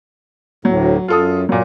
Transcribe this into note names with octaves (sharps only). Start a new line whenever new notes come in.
D2 A2 F#3
F#2 F4 A4 D#6
A#2 F#3 A#3